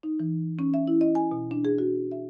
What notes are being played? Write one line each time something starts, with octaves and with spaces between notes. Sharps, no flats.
D#4
E3
C#4
E5
E4
D#5
G#5
B2
D4
G#4
F#4
E5